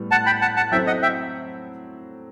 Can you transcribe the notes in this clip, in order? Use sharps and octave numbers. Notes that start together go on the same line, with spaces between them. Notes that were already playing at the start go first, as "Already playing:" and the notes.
Already playing: A2 G3 B3
F#5 A5
G5 B5
F#5 A5
F#5 A5
F#3 C4 E4 A4 E5 G5
D#5 F#5
E5 G5